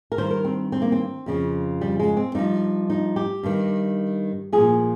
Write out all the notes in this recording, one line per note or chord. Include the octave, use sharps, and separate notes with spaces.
A#4
G2 D#3 C5
A#4
C4
C4
A#3
C4
F2 C#3 F3
G3
G#3
C4
G2 F3 D#4
D#4
G4
G2 D#3
A#2 F3 G#4